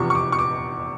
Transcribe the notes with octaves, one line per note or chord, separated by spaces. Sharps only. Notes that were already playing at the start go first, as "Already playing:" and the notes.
Already playing: F1 E2 C3 F3 C#6
C#6
D6
C#6
D6